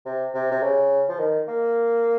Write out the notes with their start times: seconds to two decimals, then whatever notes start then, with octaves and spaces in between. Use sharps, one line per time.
0.05 C3
0.34 C3
0.51 C3
0.62 C#3
1.08 F3
1.19 D#3
1.48 A#3